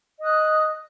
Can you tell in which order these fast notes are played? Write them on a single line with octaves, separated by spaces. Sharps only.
D#5 D#6 F#6